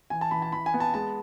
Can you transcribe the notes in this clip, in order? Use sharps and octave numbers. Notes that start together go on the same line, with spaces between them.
E3 G#5
A5
E3 B5
A5
E3 B5
G#5
B3
A5
G#3 A5